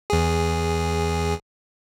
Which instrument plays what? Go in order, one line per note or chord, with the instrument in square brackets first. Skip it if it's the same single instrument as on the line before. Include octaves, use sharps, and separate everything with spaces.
[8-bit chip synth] E2 G#4